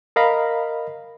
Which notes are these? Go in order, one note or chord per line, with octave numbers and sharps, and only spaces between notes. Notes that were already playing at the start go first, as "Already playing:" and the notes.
A#4 D#5 F5 A#5 B5